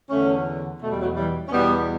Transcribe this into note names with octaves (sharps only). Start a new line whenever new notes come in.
E2 D3 A3 C#4
E2 B2 A3
G3
F#3 A3
E3 G3
C#4
E2 B2 G3 B3